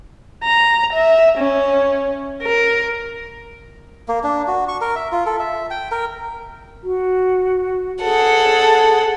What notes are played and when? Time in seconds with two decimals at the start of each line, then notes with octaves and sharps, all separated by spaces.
0.44 A#5
0.93 E5
1.38 C#4
2.43 A#4
4.08 A#3
4.24 D4
4.47 F#4
4.68 C#6
4.81 A#4
4.96 E5
5.12 F4
5.26 A4
5.40 E5
5.70 G5
5.91 A#4
6.83 F#4
8.03 G#4 A4 F#5